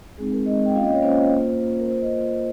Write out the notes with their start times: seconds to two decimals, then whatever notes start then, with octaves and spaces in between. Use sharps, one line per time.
0.18 G#3 C4 D#4 G#4
0.33 A#4
0.46 G#3 C4 D#4 D#5
0.66 G5
0.75 A#3 C#4 F4 F5
0.84 D#5
0.93 C#5
1.02 A#3 C#4 F4 C5
1.32 A#3 F4
1.60 A#3 F4
1.79 A#4
1.88 A#3 F4 C5
2.01 D#5
2.15 A#3 F4